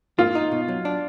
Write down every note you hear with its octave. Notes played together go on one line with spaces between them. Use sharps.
A#3 F4
D#4
B2
F#3
D4